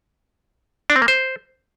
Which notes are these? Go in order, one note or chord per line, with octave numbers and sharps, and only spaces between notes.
D4
C4
A#3
C5